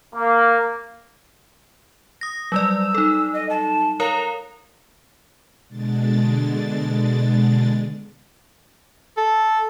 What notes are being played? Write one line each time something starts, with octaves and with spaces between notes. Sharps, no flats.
A#3
D#6 A#6
F#3 G3 D5 E6
D#4 A4
D#5
A5
A#4 C#5 F5 A#5
B2 D3 G#3 D4 A6
A4